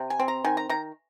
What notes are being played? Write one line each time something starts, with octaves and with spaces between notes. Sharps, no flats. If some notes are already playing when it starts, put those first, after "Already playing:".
Already playing: C3
G#5
C4
A#5
D#3 G#5
A#5
D#3 A#5